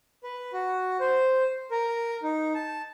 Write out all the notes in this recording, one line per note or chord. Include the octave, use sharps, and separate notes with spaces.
B4
F#4
C5
A#4
D#4
A5